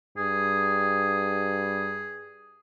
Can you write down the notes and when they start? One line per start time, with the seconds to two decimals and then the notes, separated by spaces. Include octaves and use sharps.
0.17 G2 G#4